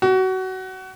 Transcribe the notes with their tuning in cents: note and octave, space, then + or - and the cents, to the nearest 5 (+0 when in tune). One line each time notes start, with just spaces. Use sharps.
F#4 +25